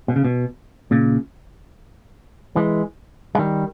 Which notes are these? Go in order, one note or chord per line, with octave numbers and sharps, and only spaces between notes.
B2
C#3
B2
A#2 C#3
E3 G#3
G#3
D#3 G3